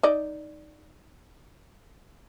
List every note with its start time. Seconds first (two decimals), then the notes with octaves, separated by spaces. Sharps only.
0.03 D#4 D5